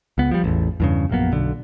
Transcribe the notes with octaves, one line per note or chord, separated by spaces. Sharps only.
C#2 B3
F3 G3
A1 E2
E2 G2 C#3
A#1 F#2 A#3 B3
B1 D3